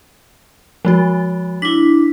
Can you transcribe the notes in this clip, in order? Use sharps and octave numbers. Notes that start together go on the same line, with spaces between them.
F3 G#3 F#4
D4 E4 B6